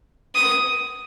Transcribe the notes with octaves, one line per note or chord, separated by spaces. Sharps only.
D#6